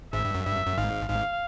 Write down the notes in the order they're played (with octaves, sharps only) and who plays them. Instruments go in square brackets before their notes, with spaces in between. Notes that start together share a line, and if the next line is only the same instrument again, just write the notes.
[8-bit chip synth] G#1 G#2 [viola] E5
[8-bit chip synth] G2
F#2
[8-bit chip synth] G2 [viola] E5
[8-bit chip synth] F#2
F#2
[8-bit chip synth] G#1 G#2 [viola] F5
[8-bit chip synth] G#1 G#2 [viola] F5